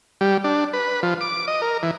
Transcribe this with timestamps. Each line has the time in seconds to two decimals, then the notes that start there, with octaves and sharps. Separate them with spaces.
0.21 G3
0.44 D4
0.73 B4
1.03 F3
1.21 D6
1.48 D#5
1.62 A#4
1.83 E3